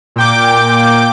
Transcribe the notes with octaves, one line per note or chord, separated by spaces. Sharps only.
A#2 G5 D6